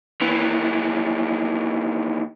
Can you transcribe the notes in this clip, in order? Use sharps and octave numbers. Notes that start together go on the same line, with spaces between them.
D#2 E3